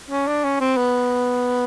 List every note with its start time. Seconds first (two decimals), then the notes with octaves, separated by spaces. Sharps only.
0.10 C#4
0.27 D4
0.44 C#4
0.60 C4
0.77 B3